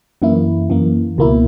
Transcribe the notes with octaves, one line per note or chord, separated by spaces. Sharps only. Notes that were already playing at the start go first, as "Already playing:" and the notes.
F#2 E3 A#3 E4
F#2 E3 A#3
C#2 B2 A#3 E4